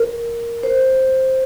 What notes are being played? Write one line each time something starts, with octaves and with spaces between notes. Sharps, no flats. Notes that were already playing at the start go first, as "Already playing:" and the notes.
Already playing: A#4
C5